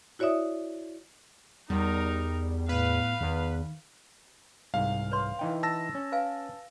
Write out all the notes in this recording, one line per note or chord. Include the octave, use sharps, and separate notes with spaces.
E4 F#4 C#5 D5 E5 D#6
E2 G3 D#4 A#4
A2 B3 B4 F5
E2 D#3
C2 G#2 F5
B4 C#5 C6
E3 D#4 G5
A5 E6 A#6
C#4
B4 F5 G#5